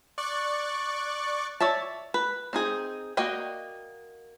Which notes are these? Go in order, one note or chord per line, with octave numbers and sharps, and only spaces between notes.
D5 C#6 F#6
C#5 D5 E5 A5
B4
C4 D#4 G#4
A#3 F#4 D5 D#5 G5